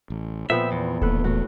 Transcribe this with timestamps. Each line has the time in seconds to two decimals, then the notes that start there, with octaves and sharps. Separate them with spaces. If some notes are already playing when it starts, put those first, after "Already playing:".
0.10 A1
0.50 A#2 F3 B3 C4 E5
0.72 E2
1.02 D#1 A1 A#3 A4 B4
1.24 A2 A3 A#3 F#4